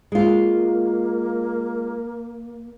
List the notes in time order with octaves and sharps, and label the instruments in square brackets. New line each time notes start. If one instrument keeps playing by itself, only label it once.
[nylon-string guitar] G#3 F4 [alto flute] A#3